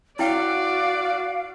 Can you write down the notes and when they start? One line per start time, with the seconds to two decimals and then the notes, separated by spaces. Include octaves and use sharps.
0.19 E4 F#4 D5 F5 G5